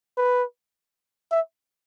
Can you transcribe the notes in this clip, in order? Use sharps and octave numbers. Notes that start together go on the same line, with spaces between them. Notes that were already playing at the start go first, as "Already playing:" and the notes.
B4
E5